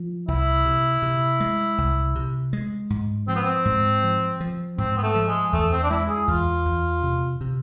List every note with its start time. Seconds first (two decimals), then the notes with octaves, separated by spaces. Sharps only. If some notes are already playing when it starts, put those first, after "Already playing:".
Already playing: F3
0.28 C2 E4
0.65 C3
1.02 C3
1.40 G#3
1.78 C2
2.15 C3
2.53 G#3
2.90 G#2
3.28 F3 C4
3.36 B3
3.43 C4
3.65 G#2
4.03 F3
4.40 F3
4.78 G#2 C4
4.97 B3
5.03 A3
5.15 F3
5.28 G#3
5.53 E2 A3
5.72 C4
5.83 D4
5.90 G#3 E4
6.09 G#4
6.28 E2 F4
6.65 E2
7.03 C3
7.41 C3